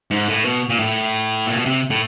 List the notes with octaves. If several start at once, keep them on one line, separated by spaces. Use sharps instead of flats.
G#2
A2
B2
A#2
A2
A#2
B2
C3
A2